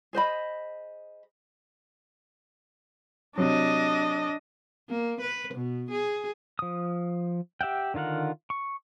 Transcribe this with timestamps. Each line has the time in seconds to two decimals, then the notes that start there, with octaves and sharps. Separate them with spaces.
0.13 G#4 C5 D#5 B5
3.38 C3 F#3 D4 D#5
4.89 A#3
5.21 B4
5.54 B2
5.90 G#4
6.59 F3 D#6
7.61 G4 E5 F#5 G5
7.94 D3 D#3 F4 A#4 F#5
8.50 C#6